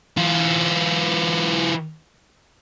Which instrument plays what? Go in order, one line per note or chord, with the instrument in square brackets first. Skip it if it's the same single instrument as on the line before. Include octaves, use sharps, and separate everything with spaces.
[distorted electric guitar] E3 F4